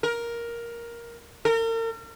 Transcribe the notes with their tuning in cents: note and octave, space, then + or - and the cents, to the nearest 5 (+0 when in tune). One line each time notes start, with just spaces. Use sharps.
A#4 +10
A#4 -40